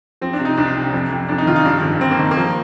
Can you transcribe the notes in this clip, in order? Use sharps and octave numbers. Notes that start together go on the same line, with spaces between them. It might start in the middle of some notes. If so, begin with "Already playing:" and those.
F3 C4
D4
C3
D#4
C2 D4
C3
F2
F2
F2 D4
D#4
D#3 F4
D#4
G2 D4
G#1
D#3 C4
A#3
D#3
A#3
F3